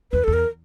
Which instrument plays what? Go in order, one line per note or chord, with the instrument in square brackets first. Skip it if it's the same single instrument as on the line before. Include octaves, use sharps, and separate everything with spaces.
[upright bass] E2 [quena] B4
[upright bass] E2 [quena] A4
[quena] A#4